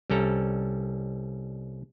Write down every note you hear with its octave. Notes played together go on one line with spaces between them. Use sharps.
C2 G3 C#4 A4 A#5